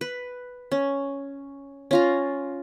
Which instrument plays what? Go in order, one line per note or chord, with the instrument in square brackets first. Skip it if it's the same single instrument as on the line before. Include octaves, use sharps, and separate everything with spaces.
[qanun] B4
C#4
C#4 F4 A#5